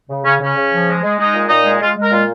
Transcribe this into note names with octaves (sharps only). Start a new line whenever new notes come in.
C#3
C#3 C#4
C#3 C#4
C#3
F3
G#3
G#3
G#3 D#4
A#2
A#2 D#4
G#3
G#3 F4
G#3
A#4
A#2 F4